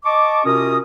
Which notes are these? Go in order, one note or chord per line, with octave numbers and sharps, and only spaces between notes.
D#5 A5 C#6 D6
C3 C#4 F4 F#4 A#4 D#6